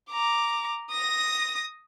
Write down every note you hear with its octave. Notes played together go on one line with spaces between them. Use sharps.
A#5 D6
D#6 A#6